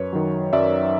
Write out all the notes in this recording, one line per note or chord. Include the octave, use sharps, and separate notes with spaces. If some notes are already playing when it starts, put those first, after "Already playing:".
Already playing: F#2 B4 C#5
D#3 F#3
F#2 D5 E5